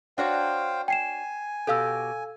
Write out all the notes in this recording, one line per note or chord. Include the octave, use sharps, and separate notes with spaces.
D4 F#4 C5 C#5 F5 G5
G5 G#5 C7 E7
B2 G4 A4 F5 E6